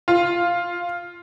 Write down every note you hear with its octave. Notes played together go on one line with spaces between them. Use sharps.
F4